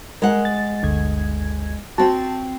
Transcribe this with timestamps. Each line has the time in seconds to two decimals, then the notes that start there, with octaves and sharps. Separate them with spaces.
0.22 G#3 A#4 F#5
0.45 A6
0.83 G1 D2 G#6
1.98 C4 F#4 A5